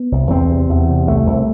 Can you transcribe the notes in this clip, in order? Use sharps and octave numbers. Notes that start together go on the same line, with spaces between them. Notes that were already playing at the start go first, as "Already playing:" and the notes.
Already playing: B3
C2
E2 C4
C3
E2
C3
C2 A3
C2